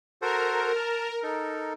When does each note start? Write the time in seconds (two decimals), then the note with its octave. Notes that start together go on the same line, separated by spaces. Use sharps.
0.22 F#4 A4 A#4 C5
0.76 A5 F6
1.23 D#4 A4 A#4